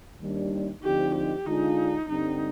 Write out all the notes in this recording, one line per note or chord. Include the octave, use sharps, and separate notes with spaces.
D#2 D#3 G3 D4
D2 D3 F3 C4 D#4 G4
G4
D3 G#3 D4 D#4 F4
G2 D3 G3 C4 D#4